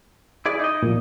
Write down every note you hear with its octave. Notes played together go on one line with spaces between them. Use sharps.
E4 G#4 D5
D#4 D#5
A#2 F3